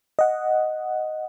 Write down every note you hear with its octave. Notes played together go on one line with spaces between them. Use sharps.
D#5 F#5